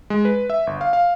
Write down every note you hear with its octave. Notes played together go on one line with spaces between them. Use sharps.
G#3
B4
E5
G1
F5
F5